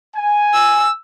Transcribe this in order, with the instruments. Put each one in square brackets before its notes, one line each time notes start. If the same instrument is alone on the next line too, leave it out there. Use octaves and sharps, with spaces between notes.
[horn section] G#5
[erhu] E6